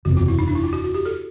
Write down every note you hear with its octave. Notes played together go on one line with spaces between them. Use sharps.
F#1 E2 C3 F#4
F4
E4
D#4
D4
E4
F4
F#4
F#4
G4
A4